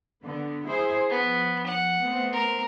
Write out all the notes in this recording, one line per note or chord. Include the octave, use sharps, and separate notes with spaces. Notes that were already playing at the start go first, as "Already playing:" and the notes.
D3 B3
E4 G#4 C5
F3 B3
F#5
A3 B3 C4
A#4